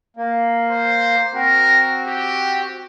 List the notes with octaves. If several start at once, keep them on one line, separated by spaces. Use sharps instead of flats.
A#3
C5
C4 F#4 A#4
G4